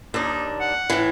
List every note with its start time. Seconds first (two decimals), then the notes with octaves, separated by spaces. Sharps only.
0.14 D#2 D4 D#4
0.60 F#5
0.90 A2 E3